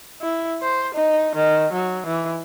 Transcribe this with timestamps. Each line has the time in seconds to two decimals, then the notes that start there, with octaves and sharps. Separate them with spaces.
0.21 E4
0.62 C5
0.95 D#4
1.36 D#3
1.73 F#3
2.07 E3